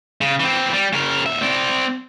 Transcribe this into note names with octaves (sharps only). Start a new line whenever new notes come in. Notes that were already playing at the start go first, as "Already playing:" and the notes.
C#3
E3 C4
G3
C#3 A#4
D#2 E5
C4 D5